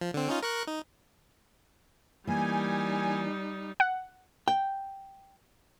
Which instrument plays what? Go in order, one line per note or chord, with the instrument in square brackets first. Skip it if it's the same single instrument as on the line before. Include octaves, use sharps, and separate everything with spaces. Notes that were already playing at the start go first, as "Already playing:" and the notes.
[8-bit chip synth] F3
D3 C4
C#4 D#4 F4
A#4 C#6 F#6
D#4
[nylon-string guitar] E3 A#3 [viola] G3 D#4 [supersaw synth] G#5
[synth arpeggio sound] F#5
[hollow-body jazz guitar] G5